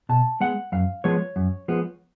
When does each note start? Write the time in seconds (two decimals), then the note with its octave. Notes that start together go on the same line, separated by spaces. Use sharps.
0.09 B2 A5
0.40 G#3 B3 F#5
0.72 F#2 F5
1.04 F3 G#3 B3 C#5
1.36 F#2
1.68 F3 G#3 B3